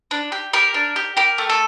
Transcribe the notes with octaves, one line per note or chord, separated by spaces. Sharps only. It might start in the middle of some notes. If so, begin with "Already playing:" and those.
D4
G4
G4 A#4
D4
G4
G4 A#4
A3
A4